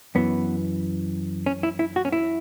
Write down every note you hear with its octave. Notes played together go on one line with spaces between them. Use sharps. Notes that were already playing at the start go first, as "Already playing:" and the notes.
F#2 E3 B3
C#4
E4
E4
F#4
C#4
E4